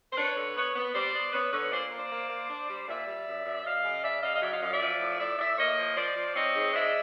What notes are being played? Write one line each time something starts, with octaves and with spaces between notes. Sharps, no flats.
C5
D4 B4 C#5
D3
B3 B4 C#5
B3
G3 C5 D5
B3
B3 B4 C#5
D3 B4 C#5
A#2 C5 D5
A#3
C5 D5
A#3
A#3
D4
G3
A#2 D5 E5
G3
F#2
F#2
F#2 D#5 F5
C#3
C#3 D5 E5
C#3 D#5 F5
D#5
F#3 D5 E5
D#5 F5
F#2 D#5 F5
D5 E5
F3
A2
A2 D5 E5
A2 D5 E5
A#3 C#5 D#5
F3
F3 C5 D5
F3
C4 C#5 D#5
G#2
G#3 D5 E5